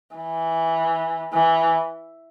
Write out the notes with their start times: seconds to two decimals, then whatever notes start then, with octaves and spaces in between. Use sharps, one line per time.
0.16 E3
1.33 E3